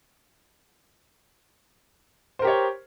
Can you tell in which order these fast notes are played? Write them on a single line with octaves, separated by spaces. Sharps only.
C5 A#4 G4 C#5